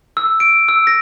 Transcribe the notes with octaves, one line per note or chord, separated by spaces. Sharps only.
E6
D7
E6
A#6